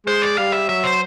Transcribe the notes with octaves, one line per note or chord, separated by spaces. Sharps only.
G#3 C5
D5
G3 F5
E5
F#3 E5
C5